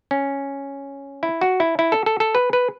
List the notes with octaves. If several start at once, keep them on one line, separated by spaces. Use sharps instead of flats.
C#4
E4
F#4
E4
E4
A4
A4
A4
B4
B4